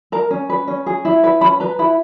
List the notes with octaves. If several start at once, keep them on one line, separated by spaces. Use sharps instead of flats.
A#4 A#5
C#4
B4
C#4
G#4
E4
B4
C#4 B5
B4 A#5
E4 B5